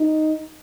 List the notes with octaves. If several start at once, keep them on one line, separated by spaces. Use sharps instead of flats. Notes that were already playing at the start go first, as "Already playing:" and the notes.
Already playing: D#4